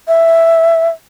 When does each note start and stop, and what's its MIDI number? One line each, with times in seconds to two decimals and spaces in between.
0.08 0.88 76